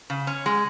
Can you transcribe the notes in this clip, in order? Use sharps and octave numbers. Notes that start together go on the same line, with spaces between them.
C#3
C#4
G#3